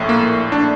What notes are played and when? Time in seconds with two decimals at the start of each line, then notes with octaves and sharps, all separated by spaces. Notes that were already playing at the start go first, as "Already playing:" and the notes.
Already playing: A#1 A2
0.09 A#3
0.52 D4